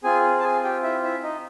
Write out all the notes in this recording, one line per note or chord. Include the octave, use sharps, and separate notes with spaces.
C4 F4 G#4 G#5
A5
G#4 G#5
G4 G5
E4 E5
E4 E5
D#4 D#5